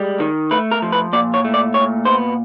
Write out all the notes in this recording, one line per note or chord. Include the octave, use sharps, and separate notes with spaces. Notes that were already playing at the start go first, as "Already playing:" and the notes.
Already playing: G3 G#3
D#3
A3 B4
A#4
F3
B4
A#2 D5
C#5
A3
D5
A#2 C#5
B3 C5